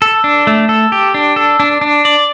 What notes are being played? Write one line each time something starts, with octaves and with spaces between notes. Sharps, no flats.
A4
D4
A3
A4
G4
D4
A4
D4
D4
D5